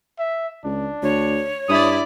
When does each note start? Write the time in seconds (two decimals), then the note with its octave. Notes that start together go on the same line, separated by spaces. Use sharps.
0.19 E5
0.64 C#2 D4
1.03 D2 C#5
1.69 G2 E4 D5 D#6